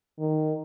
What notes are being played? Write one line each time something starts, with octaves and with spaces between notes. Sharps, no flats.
D#3